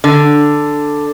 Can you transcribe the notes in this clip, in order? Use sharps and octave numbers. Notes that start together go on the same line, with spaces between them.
D3